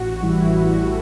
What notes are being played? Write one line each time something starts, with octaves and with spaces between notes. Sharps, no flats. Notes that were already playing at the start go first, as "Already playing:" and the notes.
Already playing: A1 F#4
A2 E3 G3 E4
A1 F#4
A4